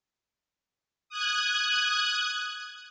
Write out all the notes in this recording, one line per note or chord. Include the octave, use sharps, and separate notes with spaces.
D#6 F#6 G#6